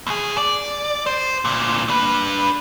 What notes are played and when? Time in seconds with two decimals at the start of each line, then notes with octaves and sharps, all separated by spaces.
0.07 D#2 G#4
0.38 D5
1.06 C5
1.45 D2 A#2
1.89 D4 B4